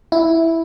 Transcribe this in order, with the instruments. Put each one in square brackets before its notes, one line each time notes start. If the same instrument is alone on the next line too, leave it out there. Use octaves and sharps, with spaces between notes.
[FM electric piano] E4